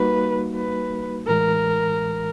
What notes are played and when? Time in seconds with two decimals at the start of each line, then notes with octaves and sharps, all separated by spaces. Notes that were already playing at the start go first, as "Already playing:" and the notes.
Already playing: G3 A#3 D#4 F#4 B4
0.56 B4
1.28 A2 E3 G#3 A#4